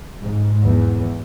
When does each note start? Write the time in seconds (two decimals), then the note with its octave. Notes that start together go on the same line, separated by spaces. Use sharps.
0.21 G#2
0.64 E2